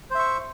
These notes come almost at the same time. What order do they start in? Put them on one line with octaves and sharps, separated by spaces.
C5 E5 C#6